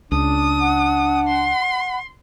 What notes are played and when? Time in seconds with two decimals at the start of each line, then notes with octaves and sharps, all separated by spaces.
0.12 C#2 D4 D#6
0.61 F#5
1.28 C6